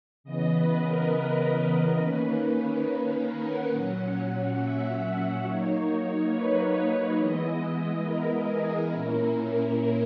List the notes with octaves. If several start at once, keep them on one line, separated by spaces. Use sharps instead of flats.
C#3 E3 B3 D#5
B4
A#4
D#3 A#3 C#4 B4
A#4
F#5
A#2 F#3 C#4
E5
F#3 A#3 D#4 C#5
C#5
B4
C#5
E3 G#3 B3 E4 D#5
A#4
G#4
A#2 A#3 C#4 E4 A#4
A#4